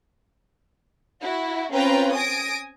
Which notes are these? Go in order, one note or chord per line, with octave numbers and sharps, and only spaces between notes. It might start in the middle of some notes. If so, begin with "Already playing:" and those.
E4 F#4
C4 C#4 F4 B4 G5 A#5
G#5 D#6 A#6 D7